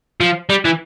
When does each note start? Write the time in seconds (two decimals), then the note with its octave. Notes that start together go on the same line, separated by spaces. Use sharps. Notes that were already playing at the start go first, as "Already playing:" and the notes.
0.20 F3
0.49 G3
0.65 E3